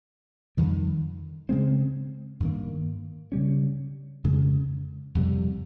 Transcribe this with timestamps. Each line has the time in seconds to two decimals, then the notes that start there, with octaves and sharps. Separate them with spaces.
0.57 F2 D#3 G3
1.49 C#3 G#3 C4
2.40 G2 D#3 A#3
3.32 C#3 G3 C#4
4.24 F2 C#3 G#3
5.15 F2 C3 G3